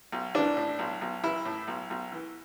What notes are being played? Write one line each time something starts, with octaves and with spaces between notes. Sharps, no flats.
B1
E3 D4
A2
B1
B1
E3 E4
A2
B1
B1
E3